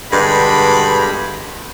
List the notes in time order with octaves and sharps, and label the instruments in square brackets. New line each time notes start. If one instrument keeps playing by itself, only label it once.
[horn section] G2 B2 D3 G#3 B5